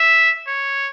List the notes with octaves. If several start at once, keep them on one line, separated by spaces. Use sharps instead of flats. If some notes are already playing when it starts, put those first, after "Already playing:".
Already playing: E5
C#5